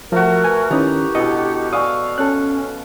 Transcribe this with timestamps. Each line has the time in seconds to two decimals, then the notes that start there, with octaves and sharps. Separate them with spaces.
0.12 F3 A3 F#4 A#4
0.44 B4 G#5
0.71 D#3 C#4 E4 G4 A#4 B4 A#5 D#6
1.15 B2 D4 E4 A4 D#5 C#7
1.73 D5 F5 G#5 C#6 D#6 E6
2.18 C#4 A4 C#5 F#6